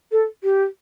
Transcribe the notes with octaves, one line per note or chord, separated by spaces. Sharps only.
A4
G4